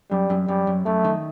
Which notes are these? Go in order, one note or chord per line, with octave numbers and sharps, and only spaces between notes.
F#2 G3
F#2
F#2 G3
F#2
F#2 A3
D#3